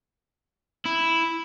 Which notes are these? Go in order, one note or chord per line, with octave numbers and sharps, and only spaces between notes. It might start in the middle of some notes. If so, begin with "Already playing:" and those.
E4